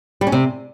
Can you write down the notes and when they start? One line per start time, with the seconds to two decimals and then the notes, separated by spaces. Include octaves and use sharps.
0.21 G3
0.27 C#4
0.32 C3